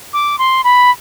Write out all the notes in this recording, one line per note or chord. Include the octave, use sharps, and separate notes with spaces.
D6
C6
B5